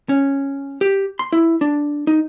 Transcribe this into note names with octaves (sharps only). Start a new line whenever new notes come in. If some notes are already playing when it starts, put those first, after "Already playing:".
C#4
G4
C6
E4
D4
D#4